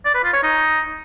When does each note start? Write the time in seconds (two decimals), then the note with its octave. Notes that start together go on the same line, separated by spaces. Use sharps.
0.05 D5
0.15 B4
0.24 F4
0.34 C#5
0.43 D#4